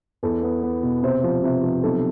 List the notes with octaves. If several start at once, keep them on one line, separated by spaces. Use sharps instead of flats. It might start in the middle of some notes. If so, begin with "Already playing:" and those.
E2 A4
B3
B3
B2
C3 C5
F3
C3
F3
B1 A4